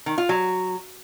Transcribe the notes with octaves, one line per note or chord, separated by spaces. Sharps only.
D#3
F4
F#3